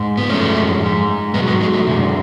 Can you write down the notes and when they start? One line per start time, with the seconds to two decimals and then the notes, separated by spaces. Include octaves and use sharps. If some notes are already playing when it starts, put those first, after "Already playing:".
Already playing: G#2 G#3
0.17 B3
0.29 F#2 F3 G#3 A3 C#4
0.81 G#2 G#3
1.34 B2 G#3 B3
1.38 F#3
1.47 G#3 B3
1.61 G#3
1.74 A3
1.86 F#2 D3 G#3 A3